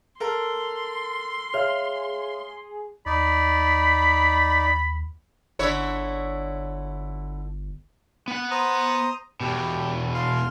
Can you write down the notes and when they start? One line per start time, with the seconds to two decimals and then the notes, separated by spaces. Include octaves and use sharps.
0.20 A4 A#4 C6
1.54 G#4 C#5 E5 F5 F6
3.06 D#2 D#4 D5 B5
5.59 G1 D3 E4 C#5
8.28 B3 F#5
8.51 C5 A#5 D#6
9.41 E2 B2 G4
10.14 F5 C6